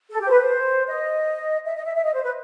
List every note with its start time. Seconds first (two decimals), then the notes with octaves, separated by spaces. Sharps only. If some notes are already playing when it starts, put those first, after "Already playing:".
0.10 A4
0.20 G4
0.26 C5
0.29 B4
0.39 C5
0.88 D#5
1.65 E5
1.75 D#5
1.85 E5
1.95 E5
2.04 D#5
2.14 C5
2.23 B4